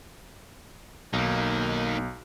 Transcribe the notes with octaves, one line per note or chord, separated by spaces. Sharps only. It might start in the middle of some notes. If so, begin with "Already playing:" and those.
B1 A#3 D#4